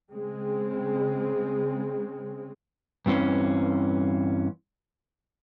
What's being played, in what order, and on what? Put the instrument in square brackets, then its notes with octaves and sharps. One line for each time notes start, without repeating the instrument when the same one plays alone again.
[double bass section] C#3 G#3 C4
[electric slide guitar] G2 E3 C4 C#4